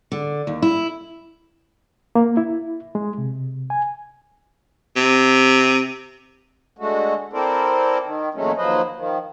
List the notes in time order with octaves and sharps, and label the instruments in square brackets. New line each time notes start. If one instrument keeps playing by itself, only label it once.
[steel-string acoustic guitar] D3
D#2
E4
[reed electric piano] A#3
E4
G#3
C3
G#5
[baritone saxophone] C3
[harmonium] D3 G#3 A3 F#4
C4 E4 A4 A#4 C5 D5
D#3
E2 A#2 F#3 G#3 A3 C#4
D#2 F3 F#3 B4 C5 D#5
D#3 F3